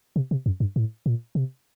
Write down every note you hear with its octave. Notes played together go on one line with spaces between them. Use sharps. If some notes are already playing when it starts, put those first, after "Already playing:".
C3
C3
F#2
G2
A2
A#2
C3